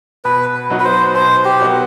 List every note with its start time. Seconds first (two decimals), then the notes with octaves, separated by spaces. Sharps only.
0.25 B2 B4
0.70 F#3 B3 D#4 F#4
0.80 B4
0.85 C5
1.15 B2 C5
1.45 G4
1.60 F#3 B3 D#4 F#4